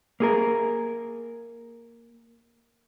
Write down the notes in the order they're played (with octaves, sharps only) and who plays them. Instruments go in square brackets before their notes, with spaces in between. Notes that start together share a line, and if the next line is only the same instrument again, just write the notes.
[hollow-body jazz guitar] A#3 G#4 A#4